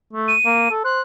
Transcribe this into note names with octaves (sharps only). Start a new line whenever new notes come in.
A3
D#7
A#3
A4
C5 F#6